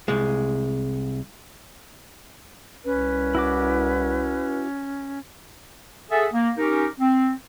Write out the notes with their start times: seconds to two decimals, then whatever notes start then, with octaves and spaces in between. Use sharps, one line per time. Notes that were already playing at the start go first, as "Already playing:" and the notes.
0.08 C2 G#3
2.85 C2 C#4 B4
3.35 E4 F#4 D6
6.11 G#4 A4 E5 F#5
6.33 A#3
6.57 C#4 D#4 G4 A#4
6.99 C4